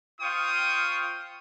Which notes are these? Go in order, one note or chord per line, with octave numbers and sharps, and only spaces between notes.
F4 C5 F5 G5 C#6 D#6